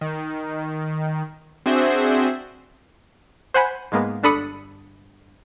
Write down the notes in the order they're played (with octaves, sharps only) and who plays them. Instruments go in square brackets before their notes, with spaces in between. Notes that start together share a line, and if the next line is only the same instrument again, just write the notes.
[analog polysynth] D#3
C4 D4 F#4 G#4 C5 E5
[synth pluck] C5 F#5 G#5 B5
G#2 G#3 A#3 B3
G1 D4 A4 B5 D#6 C#7